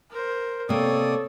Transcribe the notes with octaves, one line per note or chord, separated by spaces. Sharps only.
A#4 C5
C3 A#3 A4 C#5 D5 D#6